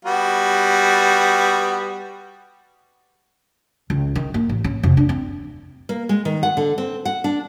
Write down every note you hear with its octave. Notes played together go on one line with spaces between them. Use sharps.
G3 B3 F#4
C#2
D#3
A#3
A1
C#4
F1
D4
C4
A#3
G#3
D#3
F#5
D3
C4
F#5
D4